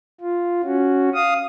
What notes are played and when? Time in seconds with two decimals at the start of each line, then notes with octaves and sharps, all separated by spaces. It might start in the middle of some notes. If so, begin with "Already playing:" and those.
0.21 F4
0.63 C#4 F#4
1.14 F5 D#6